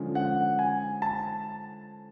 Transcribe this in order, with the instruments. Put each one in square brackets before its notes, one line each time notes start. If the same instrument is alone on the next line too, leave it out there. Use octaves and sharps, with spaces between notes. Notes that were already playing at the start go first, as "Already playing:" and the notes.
Already playing: [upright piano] D3 F3 G#3 C#4
[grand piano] F#5
G#5
A5